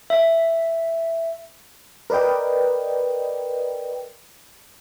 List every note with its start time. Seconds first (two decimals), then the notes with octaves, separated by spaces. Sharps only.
0.10 E5
2.10 A#4 B4 D5 D#5 G5